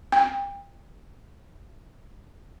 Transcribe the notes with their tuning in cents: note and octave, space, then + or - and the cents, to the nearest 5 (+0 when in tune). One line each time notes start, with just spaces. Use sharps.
G5 +30